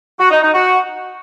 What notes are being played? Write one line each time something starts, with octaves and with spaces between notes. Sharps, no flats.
F#4
D#4
D#4
F#4